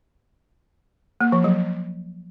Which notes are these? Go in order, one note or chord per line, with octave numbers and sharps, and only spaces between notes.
A#3
F3
F#3